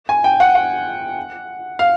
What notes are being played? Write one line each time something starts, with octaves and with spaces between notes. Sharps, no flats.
G#5
G5
F#5
F#5
F5